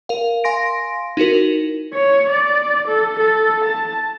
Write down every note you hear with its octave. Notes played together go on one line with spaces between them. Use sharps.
A#4 F5
F5 G#5 C6 A#6 D7
D#4 E4 F#4 A#4
C#5
D5
A4
A4
A5